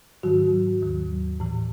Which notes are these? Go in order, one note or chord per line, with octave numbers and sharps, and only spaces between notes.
G#2 D#3 F#3 F#4
D#2 D#3 F#3
A2 E3